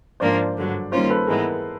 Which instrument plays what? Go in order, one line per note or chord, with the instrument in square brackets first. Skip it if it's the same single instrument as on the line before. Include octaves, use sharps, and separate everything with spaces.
[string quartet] G#2 F3 A#3 D4 [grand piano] C5 D5
[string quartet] G2 D3 F#3
[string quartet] D#3 G3 A#3 C#4 F4 [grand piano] A#4 C5
[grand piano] A4 B4
[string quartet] G#2 E3 G#3 B3 [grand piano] G#4 A#4